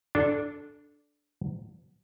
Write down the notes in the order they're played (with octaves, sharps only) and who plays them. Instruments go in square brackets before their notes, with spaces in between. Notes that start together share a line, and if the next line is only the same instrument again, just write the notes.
[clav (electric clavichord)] D4 A4